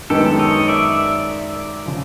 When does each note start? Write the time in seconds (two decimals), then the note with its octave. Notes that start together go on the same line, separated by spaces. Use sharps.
0.10 F#2 D#3 G#3 B3 D#4 G4 A4
0.39 C#5 D#5
0.68 D5 E5
1.86 C#3 F3